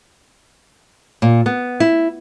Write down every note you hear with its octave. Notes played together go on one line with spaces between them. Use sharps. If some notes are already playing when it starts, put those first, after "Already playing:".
A#2
B3
E4